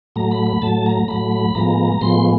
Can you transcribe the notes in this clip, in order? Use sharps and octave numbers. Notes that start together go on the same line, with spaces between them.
A2 F#3 A3 A#5
B5
B5
A2 F#3 A3 A5
A#5
A2 F#3 A3 B5
B5
A2 F3 G#3 B3 A#5
A2 F3 G#3 B3 C6